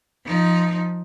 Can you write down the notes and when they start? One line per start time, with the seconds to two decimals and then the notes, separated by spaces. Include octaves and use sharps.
0.24 F3 D#4